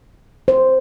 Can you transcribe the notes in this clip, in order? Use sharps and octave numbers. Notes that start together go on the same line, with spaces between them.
C5